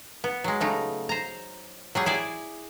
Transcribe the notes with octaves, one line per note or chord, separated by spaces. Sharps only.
B3
F#3 G#3
C#3 A3 D#4
C5 A#5
F#3 G3 G#4
E4 G#4 D5